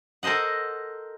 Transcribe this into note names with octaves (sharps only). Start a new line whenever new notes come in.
A4 A#4 C5 D#5 F#5